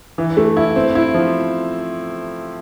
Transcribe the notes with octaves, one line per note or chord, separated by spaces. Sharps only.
E3
A3
E4
C4
E4
F3